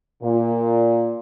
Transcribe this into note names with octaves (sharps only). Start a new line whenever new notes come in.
A#2